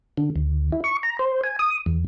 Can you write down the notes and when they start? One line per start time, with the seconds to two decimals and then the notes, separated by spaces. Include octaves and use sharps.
0.17 D3
0.36 D2
0.72 E4
0.84 C#6
1.03 A#5
1.19 C5
1.44 G#5
1.59 D#6
1.86 E2